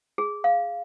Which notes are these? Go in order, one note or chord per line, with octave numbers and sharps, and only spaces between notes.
G#4
F5